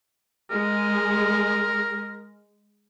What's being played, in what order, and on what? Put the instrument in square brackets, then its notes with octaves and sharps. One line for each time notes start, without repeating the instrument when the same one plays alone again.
[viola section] G#3 [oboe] A#4